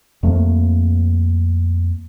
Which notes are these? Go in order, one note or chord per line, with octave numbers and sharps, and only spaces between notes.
F2 A3 A#3